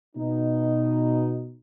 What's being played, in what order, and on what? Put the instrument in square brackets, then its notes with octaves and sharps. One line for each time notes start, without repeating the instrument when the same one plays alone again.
[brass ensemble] B2 D#4